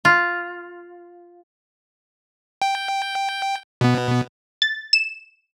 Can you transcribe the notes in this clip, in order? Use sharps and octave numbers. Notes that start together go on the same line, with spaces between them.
F4
G5
B2 B3
A6
E7